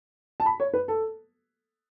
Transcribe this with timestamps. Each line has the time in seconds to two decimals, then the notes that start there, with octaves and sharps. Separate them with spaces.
0.40 A5
0.46 B5
0.60 C#5
0.74 B4
0.88 A4